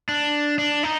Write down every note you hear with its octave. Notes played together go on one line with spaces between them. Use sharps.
D4
D4
D#4